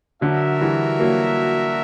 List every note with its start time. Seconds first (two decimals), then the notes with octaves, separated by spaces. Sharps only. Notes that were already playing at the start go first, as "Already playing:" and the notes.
0.21 D3 F#3 D4 F#4 A#4 E5
0.61 E3 G3
1.00 F#3 A#3